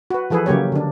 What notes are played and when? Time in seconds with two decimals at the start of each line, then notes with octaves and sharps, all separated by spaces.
0.10 F#4 B4
0.30 E3 F3 G#4 A4 B4
0.46 C#3 F#3 A#3 G4 C#5
0.72 D3 D4